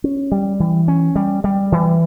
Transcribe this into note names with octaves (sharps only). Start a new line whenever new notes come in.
C#4
G3
E3
C#4
G3
G3
E3